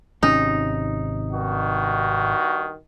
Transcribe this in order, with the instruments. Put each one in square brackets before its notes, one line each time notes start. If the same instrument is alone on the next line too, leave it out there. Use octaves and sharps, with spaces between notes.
[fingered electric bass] G#1 C3 C#4 [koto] D#4
[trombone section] G2 D#3 F#4